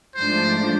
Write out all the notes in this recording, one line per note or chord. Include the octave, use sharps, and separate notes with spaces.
G#2 F3 A3 D4 C5